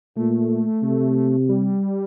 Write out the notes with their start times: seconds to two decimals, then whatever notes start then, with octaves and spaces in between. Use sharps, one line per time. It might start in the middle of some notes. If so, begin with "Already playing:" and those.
0.16 A#2 A3
0.83 C3
1.49 G3